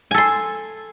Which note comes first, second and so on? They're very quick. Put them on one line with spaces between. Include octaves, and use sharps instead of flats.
G#5 A4 C6